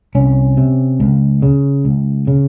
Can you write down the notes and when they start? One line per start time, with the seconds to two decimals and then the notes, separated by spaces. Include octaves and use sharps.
0.15 C2 C#4
0.57 C3
1.00 C#2
1.42 C#3
1.85 C#2
2.27 C#3